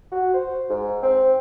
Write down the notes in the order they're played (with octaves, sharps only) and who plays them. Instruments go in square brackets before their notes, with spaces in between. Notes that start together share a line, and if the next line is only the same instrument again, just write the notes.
[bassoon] F#4
C5
G#2
C4